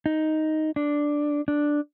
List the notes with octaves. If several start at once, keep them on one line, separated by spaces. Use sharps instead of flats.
D#4
D4
D4